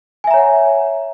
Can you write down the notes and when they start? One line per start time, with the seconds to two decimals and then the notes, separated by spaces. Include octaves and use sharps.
0.24 G#5
0.27 E5
0.31 A#5
0.34 C#5
0.37 F#5